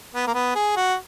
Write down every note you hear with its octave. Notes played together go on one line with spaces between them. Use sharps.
B3
A#3
B3
G#4
F#4